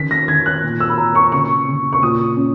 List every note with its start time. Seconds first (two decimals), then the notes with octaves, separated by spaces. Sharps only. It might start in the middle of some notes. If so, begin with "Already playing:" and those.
Already playing: D#3 C#4 B6
0.11 A#6
0.28 D#3 G#6
0.46 F#6
0.63 A#2
0.80 E6
0.90 B5
0.98 A#2 A#5
1.15 C#6
1.32 C#3 C#6
1.68 C#3
1.93 C#6
2.02 A#2 D#6
2.37 C#4